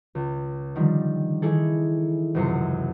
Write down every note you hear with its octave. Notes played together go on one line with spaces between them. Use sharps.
C#2
D3 D#3 F3 G3
D#3 E3 E4 G#4 A4
E1 C#2 F#2 C3 C7 C#7